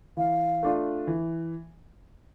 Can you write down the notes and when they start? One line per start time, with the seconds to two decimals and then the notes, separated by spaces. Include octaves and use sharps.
0.17 E3 F5
0.63 A3 D4 F4
1.07 E3